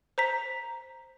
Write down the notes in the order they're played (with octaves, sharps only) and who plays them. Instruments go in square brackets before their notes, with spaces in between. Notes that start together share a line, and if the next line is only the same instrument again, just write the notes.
[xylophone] C5 A#5 B6